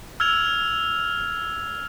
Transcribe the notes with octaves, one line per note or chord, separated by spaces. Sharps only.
E6 F6 G#6 F7